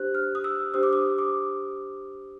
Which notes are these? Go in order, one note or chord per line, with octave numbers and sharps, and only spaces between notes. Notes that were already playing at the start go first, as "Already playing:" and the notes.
Already playing: D4 G4 C5 F#6
F6
D#6
E6
D4 G4 C5 D#6
D6
D#6
D6